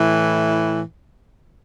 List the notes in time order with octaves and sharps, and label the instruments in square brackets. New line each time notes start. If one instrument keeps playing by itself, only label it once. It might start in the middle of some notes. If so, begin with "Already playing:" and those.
Already playing: [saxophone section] A2 E3